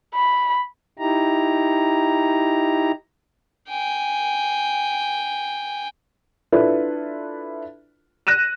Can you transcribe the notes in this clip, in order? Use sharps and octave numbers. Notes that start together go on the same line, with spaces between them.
B5
D#4 E4 G4 A#5
G5 G#5
D4 E4 F4 A4 B4
F#6 A#6 D#7 E7